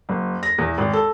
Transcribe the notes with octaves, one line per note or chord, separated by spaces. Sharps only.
F#1
A#6
E2
G#1
A4